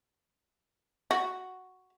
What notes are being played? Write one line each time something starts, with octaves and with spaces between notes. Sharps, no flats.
F#4